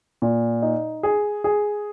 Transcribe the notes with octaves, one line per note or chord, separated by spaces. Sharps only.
A#2
D#4
G#4
G#4